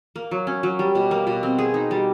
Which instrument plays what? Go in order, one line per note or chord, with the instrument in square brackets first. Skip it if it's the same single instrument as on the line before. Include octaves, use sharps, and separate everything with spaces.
[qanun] A#3
F#3
C#4
F#3
G3
B2
A#3
B2
C4
G#4
D#4
G3